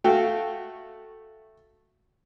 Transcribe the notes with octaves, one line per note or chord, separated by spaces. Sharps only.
A3 F#4 F5 G5